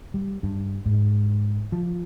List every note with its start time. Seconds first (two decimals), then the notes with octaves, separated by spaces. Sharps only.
0.14 G3
0.43 G2
0.86 G#2
1.72 F3